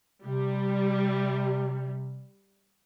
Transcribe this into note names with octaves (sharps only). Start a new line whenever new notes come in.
C3 G3